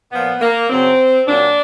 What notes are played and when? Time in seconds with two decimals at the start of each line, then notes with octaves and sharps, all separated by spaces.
0.12 A#2 F3 B3
0.41 A#3
0.70 F#2 C#3 F#3 C4
1.27 A#2 F#3 D4